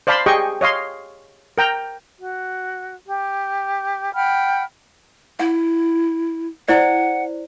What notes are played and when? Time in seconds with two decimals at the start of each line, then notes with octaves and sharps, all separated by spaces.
0.07 C5 D5 F5 A5 B5 C6
0.26 G4 G#4 D#5 G5 C#6
0.61 C#5 D#5 F5 C6
1.58 A#4 G5 A#5
2.19 F#4
3.06 G4
4.15 F#5 G5 B5 F6
5.39 E4 F#5
6.68 E4 C5 D5 F#5